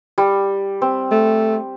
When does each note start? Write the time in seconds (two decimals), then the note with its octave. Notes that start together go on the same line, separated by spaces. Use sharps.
0.18 G3
0.82 C4
1.11 A3